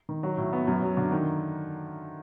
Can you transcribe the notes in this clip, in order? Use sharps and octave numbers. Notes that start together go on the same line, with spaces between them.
D#3
F#3
A2
B3
F#2
F#3
D3
D#3